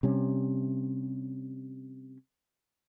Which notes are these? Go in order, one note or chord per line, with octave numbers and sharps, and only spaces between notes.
C3 G3 C#4